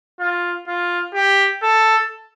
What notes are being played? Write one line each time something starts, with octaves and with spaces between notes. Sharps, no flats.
F4
F4
G4
A4